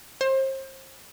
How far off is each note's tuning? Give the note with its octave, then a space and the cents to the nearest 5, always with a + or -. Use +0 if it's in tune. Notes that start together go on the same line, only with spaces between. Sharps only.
C5 +35